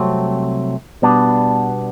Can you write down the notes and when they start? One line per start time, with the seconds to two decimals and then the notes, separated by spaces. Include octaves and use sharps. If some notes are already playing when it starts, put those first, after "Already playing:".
Already playing: C2 C3 F#3 A3 C4
1.02 B2 G3 B3 D4